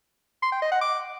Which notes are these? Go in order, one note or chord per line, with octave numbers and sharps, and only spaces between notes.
C6
G5
D#5
F#5
D6